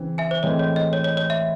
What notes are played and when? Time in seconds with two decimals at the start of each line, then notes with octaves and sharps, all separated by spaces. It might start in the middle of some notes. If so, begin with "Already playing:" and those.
Already playing: C#3 E3 C4
0.18 E5 G#5
0.31 C5
0.43 A2 E3 G#3 C4 C#5
0.59 C#5
0.76 D#5
0.93 C#5
1.04 C#5
1.17 C#5
1.30 E5